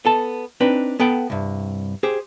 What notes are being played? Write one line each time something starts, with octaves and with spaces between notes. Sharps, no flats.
B3 A4 A5
C4 D4 D#4 B4
B3 A4 F#5 G5
C2 G2
G4 G#4 C5